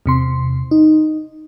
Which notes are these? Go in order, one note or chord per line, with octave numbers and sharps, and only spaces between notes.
E2 C3 C6
D#4